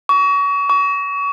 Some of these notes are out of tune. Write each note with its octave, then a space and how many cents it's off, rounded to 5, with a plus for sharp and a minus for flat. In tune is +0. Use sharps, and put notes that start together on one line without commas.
C#6 +35
C#6 +35